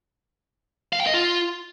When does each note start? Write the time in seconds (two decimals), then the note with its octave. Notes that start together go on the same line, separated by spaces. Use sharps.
0.93 F5
1.00 G5
1.07 D#5
1.14 F4